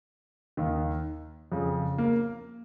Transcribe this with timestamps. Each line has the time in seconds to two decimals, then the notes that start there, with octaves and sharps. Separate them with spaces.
0.57 D#2 D#3
1.52 F2 C#3
1.98 A#3